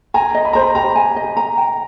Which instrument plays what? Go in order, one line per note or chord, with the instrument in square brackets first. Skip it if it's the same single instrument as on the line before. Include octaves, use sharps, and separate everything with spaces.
[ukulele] G#5 [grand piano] A#5
[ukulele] D#5
[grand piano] B5
[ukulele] C5 [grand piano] A#5
[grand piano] B5
[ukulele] G4 [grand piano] A#5
[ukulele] G#5
D#5
A#5
G5